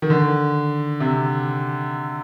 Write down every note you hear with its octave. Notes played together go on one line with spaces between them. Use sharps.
D#3
D3
C3